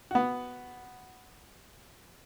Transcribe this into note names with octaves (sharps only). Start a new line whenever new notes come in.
B3 F#4